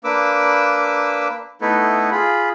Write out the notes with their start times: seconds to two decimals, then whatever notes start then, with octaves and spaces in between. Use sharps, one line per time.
0.04 A#3 D4 B4 D6 E6
1.61 A3 B3 D#4 E4 A4 B4
2.12 F4 G#4 B5